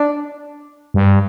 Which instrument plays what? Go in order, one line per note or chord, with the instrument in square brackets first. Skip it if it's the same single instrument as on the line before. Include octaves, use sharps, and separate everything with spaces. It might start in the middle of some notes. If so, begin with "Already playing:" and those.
Already playing: [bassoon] D4
[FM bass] G2